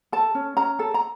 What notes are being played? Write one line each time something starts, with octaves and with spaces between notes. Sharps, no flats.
A4 A5
C#4
C#4 A#5
A4
A#5